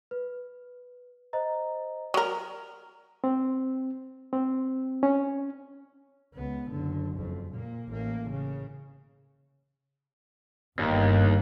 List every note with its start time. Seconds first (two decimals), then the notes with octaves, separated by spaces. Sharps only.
0.11 B4
1.33 C5 D#5 A#5
2.14 F#3 A#4
3.24 C4
4.33 C4
5.03 C#4
6.34 C#2 B3
6.71 F#1 D3
7.17 F#1 F2
7.51 A#2 A#3
7.89 A1 A#3
8.30 C#3
10.79 G1 D#2